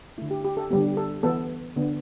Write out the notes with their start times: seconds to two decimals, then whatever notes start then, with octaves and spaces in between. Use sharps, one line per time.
0.18 D3 A3 E4
0.31 G4
0.44 G4
0.57 A4
0.70 D3 G3 B3 G4
0.97 A4
1.23 E3 B3 A4
1.76 D3 B3